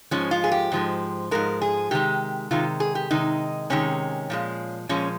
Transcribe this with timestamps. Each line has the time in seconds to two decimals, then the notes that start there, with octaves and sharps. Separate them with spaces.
0.11 G#2 F3 G#3 C#4
0.31 F4
0.44 G#4
0.52 G4
0.72 G#2 F3 G#3
1.31 G#2 F3 G#3 A#4
1.61 G#4
1.91 C3 D#3 G#3 G4
2.51 C3 D#3 G#3 F4
2.80 G#4
2.95 G4
3.11 C3 D#3 G#3 D#4
3.70 C3 D#3 G#3 C#4
4.30 A#2 F3 G#3
4.89 A#2 F3 G#3 C#4